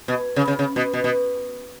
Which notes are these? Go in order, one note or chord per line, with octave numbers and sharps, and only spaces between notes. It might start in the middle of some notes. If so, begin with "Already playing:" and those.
B2
C#3
C#3
C#3
B2
B2
B2